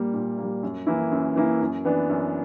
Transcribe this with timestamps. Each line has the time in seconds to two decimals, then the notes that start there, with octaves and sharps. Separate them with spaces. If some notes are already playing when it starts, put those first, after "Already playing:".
Already playing: A#2 G3 A#3
0.14 A#2
0.38 A#3
0.43 G3
0.63 F#2
0.87 E3 A#3 E4
1.11 F#2
1.36 E3 A#3 E4
1.61 F#2
1.85 E3 B3 D4
2.10 F#2